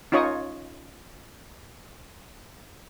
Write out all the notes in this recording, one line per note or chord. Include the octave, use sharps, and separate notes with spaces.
C#4 D#4 F4 C#5 C#6 D#6